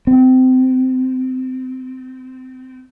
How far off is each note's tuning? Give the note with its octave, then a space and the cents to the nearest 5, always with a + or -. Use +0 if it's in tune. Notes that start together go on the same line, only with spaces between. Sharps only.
C4 -25